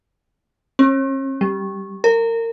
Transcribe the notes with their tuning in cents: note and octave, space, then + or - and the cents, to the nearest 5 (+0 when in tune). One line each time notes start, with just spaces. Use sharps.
C#4 -45
G3 -5
A#4 -25